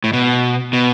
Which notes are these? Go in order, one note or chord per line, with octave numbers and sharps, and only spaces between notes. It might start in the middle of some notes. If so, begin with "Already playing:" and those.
A2
B2
B2